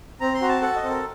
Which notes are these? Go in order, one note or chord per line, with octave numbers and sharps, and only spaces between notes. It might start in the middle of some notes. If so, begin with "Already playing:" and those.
C4 A#5
C6
F#4 A#5
A5
A4 F#5
D#5
C4
A#4